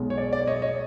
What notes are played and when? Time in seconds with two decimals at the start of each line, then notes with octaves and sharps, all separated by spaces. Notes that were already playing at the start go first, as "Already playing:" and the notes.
Already playing: B1 B2 G#3
0.10 C#5
0.18 D5
0.33 D5
0.47 C#5 D#5
0.62 C#5 D#5